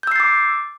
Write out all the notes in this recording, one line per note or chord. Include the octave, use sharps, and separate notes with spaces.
D6 E6 G6 A6 C7